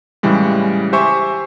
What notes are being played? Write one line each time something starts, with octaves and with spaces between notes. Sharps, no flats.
A2 C#3 E3 G3 G#3
G4 C5 E5 G#5 C#6